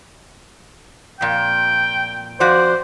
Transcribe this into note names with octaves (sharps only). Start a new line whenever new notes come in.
F2 A#2 G5
F2 F#4 C5 D5